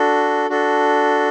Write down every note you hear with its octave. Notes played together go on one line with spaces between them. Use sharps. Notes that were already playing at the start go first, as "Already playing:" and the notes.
Already playing: D4 F#4 A4
D4 F#4 A4